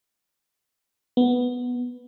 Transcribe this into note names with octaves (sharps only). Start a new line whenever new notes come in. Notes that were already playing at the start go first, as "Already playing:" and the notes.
B3